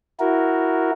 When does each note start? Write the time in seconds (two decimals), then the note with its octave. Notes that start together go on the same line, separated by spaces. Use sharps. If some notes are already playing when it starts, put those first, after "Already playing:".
0.20 E4 F#4 A#4